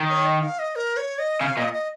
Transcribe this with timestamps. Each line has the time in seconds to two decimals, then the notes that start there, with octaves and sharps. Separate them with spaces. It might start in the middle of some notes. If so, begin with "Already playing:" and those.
Already playing: D#3
0.10 C#5
0.26 D#5
0.43 F5
0.59 D#5
0.76 A#4
0.97 C#5
1.19 D#5
1.41 C#3 F5
1.57 A#2 D#5
1.73 D#5